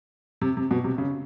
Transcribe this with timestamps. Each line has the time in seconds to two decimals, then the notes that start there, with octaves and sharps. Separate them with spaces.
0.41 C3
0.57 C3
0.71 B2
0.84 C3
0.98 C#3